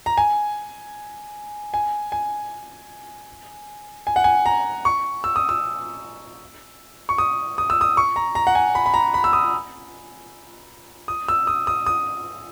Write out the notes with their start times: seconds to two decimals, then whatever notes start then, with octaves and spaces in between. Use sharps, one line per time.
0.06 A#5
0.17 G#5
1.74 G#5
2.12 G#5
4.07 G#5
4.16 F#5
4.24 G#5
4.46 A#5
4.85 C#6
5.24 E6
5.36 D#6
5.49 E6
7.09 C#6
7.18 D#6
7.58 D#6
7.70 E6
7.81 D#6
7.97 C#6
8.16 A#5
8.35 A#5
8.47 F#5
8.55 G#5
8.75 B5
8.86 B5
8.94 A#5
9.14 B5
9.24 E6
9.33 D#6
11.08 D#6
11.28 E6
11.47 D#6
11.67 D#6
11.86 D#6